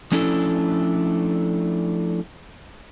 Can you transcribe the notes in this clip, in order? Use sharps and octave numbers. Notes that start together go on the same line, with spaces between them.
F3 A3 C#4 D4 E4 A4